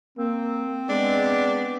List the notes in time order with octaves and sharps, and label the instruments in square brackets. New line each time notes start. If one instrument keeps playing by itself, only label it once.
[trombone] A#3 [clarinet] C4
[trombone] G#3 [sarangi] B3 [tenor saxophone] D4